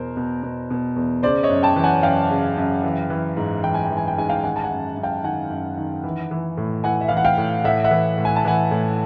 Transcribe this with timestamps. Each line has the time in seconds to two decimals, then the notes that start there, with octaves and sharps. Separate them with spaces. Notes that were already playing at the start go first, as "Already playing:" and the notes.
Already playing: E2 B2 A#4 C5
0.17 B2
0.43 B2
0.70 B2
0.96 E2
1.23 C#3 C5 D5
1.43 C#5 D#5
1.50 F#2
1.63 G5 A5
1.76 E3
1.84 F#5 G#5
2.03 F#2 F5 G5
2.30 C#3
2.57 F#2
2.83 E3
3.10 E3
3.37 G#2
3.63 E3 G5
3.74 G#5
3.86 E3 G5
3.97 G#5
4.08 G5
4.17 G#2 G#5
4.29 F5 G5
4.44 D#3 F#5 G#5
4.56 A5
4.64 F#5 G#5
4.71 F#2
4.97 F#2
5.03 F5 G5
5.23 D#3 F#5 G#5
5.50 F#2
5.77 D#3
6.04 E3
6.31 E3
6.57 A2
6.84 E3 F#5 G#5
7.01 E5
7.08 E3 F5
7.17 F#5
7.25 F5 G5
7.38 A2
7.64 A2 E5 F#5
7.84 E5 F#5
7.91 E3
8.18 A2
8.25 G#5
8.36 A5
8.45 E3 F#5 G#5
8.71 A2